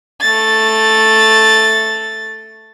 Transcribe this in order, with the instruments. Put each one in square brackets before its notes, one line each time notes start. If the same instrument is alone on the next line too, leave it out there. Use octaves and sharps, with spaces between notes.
[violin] A3 A6